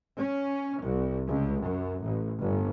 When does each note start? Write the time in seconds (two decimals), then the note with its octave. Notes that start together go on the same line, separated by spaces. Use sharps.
0.16 C#4
0.80 C2
1.27 C#2
1.62 F#2
2.01 A1
2.39 G1